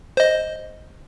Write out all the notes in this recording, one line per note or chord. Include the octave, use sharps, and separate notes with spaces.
C5 D#5